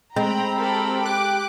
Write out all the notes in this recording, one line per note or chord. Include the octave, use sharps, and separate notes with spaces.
G#3 C4 G5 A#5 B5
G4 A4 A#4 B5
G4 D6 F#6